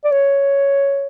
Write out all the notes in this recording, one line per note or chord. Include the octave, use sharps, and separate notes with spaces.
D5
C#5